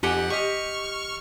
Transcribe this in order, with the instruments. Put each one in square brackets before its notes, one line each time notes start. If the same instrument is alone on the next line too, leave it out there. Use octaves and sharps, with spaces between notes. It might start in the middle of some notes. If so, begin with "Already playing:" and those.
[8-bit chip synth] F2 F#5 [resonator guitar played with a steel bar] D#4 G4 G#5
[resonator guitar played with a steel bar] G4 D#5 [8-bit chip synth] C#6 F6